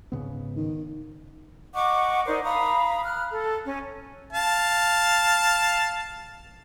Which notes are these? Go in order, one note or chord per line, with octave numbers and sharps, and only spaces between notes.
G#2 C#3 B3
D#3
D#5 F#5 C#6 D6
D#4 A#4 C5 D5
F5 A#5 B5 D#6
F6 F#6
A4
C#4
F5 A5